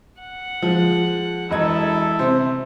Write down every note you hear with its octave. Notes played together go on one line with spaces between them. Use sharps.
F#5
F3 G#3
E1 E4 A4 D#5 G#6
C3 C5